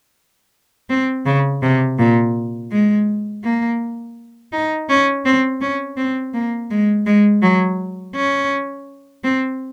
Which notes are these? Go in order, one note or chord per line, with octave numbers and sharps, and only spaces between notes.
C4
C#3
C3
A#2
G#3
A#3
D#4
C#4
C4
C#4
C4
A#3
G#3
G#3
F#3
C#4
C4